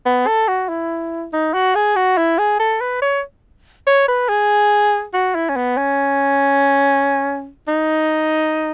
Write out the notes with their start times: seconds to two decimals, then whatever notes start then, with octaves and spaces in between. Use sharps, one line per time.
0.06 B3
0.27 A4
0.48 F#4
0.69 E4
1.33 D#4
1.54 F#4
1.75 G#4
1.96 F#4
2.17 E4
2.38 G#4
2.60 A4
2.81 B4
3.02 C#5
3.87 C#5
4.08 B4
4.29 G#4
5.14 F#4
5.35 E4
5.49 C#4
5.56 B3
5.77 C#4
7.68 D#4